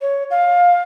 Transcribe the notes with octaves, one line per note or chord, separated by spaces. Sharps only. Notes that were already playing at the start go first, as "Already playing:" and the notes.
C#5
F5